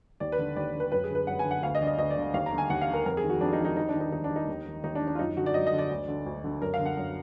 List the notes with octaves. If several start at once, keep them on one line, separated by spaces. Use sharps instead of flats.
D#2 D5
B4
D3
D#2 D5
D3
B4
F#2 B4
G#4
D3
B4
F#2 F#5
G#5
D3
F#5
D2 F5
D#5
D3 D5
D#5
D2 D#5
D5
D3
D5
D#2 F5
A#5
D3
G#5
D#2 F#5
F5
D3
A#4
F2 A#4
G#4
D#3
F#4
F2 D4
D#4
D#3
D#4
D#2 D#4
D4
D#3
D#4
D#2 D#4
D4
D#3
D#4
D#2
D#3
D#2 D#4
D4
D#3
D4
F4
F#2 D#4
D3 F#4
D5
F#2 D#5
D#5
D3
D5
D2
D3
D2
D3
F#2 A#4
F5
D3
F#5
F#2